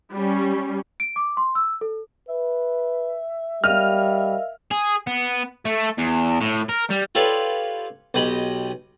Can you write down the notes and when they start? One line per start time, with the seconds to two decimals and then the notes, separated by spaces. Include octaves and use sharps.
0.13 G3 C#4
1.00 D7
1.16 D6
1.37 C6
1.55 E6
1.81 A4
2.29 B4 E5
3.64 G3 A#4 D#5 F5 F6
4.71 G#4
5.07 B3
5.65 A3
5.98 E2
6.41 A2
6.69 A#4
6.90 G3
7.15 F4 G4 A4 B4 C#5 D5
8.14 B1 G4 D#5 B5